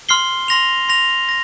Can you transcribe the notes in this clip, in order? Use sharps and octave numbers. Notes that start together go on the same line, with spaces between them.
C6 F6 C7 G7
C6 A#6 F7
C6 A#6 F7
A#6